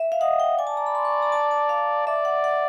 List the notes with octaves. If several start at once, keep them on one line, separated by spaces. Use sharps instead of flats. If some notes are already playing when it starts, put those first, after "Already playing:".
Already playing: E5
F5
D#5 F#5
G5
D5 G#5
A5
A#5
B5
C6
C#6
B5
A#5
A5
A5
F5
D5 E5
F#5
F#5